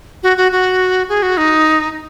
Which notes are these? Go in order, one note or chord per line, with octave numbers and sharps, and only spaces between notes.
F#4
F#4
F#4
G#4
F#4
D#4